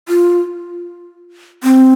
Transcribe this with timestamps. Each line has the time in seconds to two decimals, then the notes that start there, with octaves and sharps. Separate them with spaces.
0.09 F4
1.64 C4